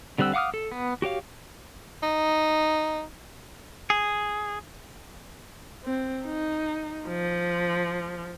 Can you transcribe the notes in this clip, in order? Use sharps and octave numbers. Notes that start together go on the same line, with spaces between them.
D3 G3 C4 F#5 E6
F5 F#5 D6 D#6 F6
A4
B3
F#4 G4 C#5 F5
D#4
G#4
C4
D#4
F3